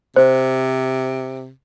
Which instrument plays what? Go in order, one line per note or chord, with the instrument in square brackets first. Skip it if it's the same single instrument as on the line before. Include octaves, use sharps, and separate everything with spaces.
[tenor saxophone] C3 [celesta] C5